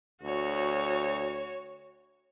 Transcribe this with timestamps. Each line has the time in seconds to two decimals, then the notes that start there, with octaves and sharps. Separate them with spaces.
0.23 D2 F#4 C#5